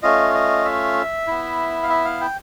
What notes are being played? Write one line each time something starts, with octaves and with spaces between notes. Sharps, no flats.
A3 C#4 F4 D#5
D#5
E5
B3 E4
F5
E5
F5
G5